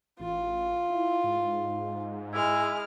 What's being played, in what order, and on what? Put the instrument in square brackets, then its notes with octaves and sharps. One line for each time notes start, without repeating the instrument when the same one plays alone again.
[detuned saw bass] A1 [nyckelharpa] F4
[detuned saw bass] E4
G#2
[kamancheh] G#3 F6 [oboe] E4